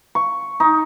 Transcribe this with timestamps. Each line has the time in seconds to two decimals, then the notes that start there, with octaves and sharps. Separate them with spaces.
0.15 C#6
0.60 D#4